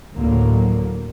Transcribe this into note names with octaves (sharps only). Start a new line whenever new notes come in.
D2 A2 D3 F#3 A#3